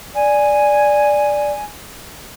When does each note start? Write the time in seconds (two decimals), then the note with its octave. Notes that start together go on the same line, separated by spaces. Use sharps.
0.15 D5 G#5